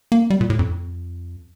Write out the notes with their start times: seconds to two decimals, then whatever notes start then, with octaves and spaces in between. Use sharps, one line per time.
0.12 A#3
0.30 G3
0.41 A#2
0.50 A2
0.59 F2